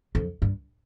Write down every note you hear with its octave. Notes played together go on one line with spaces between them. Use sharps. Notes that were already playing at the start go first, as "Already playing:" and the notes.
F2
G2